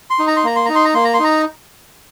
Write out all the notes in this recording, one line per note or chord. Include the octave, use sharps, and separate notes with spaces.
C6
D#4
A#5
C6
A#3 A#5
C6
D#4 A#5
C6
A#5
A#3 C6
A#5
C6
D#4 A#5